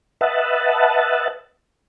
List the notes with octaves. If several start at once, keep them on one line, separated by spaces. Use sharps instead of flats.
B4 D#5 E5 F#5 A5